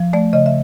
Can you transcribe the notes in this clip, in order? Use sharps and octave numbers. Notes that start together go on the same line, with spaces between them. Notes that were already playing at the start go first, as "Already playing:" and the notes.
Already playing: F3
A3 D5
C#3 D#5
E5